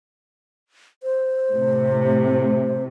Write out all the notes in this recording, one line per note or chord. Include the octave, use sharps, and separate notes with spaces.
C5
A2 C3